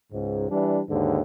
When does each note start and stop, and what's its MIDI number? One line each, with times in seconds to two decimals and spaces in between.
0.13 0.48 37
0.13 0.48 44
0.51 0.81 52
0.51 0.81 55
0.51 0.81 62
0.89 1.22 39
0.89 1.22 44
0.89 1.22 50